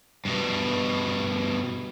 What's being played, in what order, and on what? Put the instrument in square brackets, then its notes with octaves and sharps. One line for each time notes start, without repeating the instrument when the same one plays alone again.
[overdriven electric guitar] G2 B2